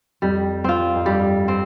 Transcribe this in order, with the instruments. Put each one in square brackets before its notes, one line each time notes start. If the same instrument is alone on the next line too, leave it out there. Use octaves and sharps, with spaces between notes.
[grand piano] F2 [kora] G3
[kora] C4 F4
[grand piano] F2
[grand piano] G2 [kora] G3
[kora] C4